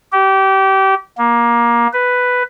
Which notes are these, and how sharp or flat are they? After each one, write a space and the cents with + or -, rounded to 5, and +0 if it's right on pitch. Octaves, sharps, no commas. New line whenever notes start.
G4 -25
A#3 +20
B4 +5